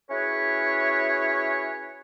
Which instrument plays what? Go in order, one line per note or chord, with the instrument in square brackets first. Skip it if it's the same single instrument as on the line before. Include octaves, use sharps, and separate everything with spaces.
[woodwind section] C#4 E4 F#4 G#4 B4 C#5